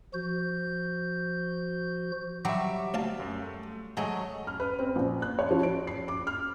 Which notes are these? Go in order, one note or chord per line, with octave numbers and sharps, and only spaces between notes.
F3 F#4 G6
F#3 G3 F#4 E5 D6
D2 F5 A5
F#2
A3
F#3 G#3 A3 C#5 D#5 G#5
F6
B4
C4
A#1
F#6
C#5
F3
D7
C7
D6
F6